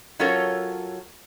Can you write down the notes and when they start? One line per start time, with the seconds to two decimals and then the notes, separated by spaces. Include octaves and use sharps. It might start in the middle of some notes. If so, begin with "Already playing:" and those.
0.19 F#3 C#4 F4 A4 A#4 C#5